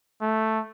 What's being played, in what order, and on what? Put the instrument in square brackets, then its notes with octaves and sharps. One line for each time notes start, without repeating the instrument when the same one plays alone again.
[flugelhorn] A3